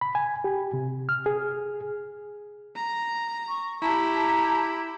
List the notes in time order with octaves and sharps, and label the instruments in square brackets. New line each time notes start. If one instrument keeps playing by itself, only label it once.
[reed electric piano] B5
G#5
G4
C3
F6
G#4
[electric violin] A#5
[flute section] C#6
[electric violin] E4 G4 [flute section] A5 A#5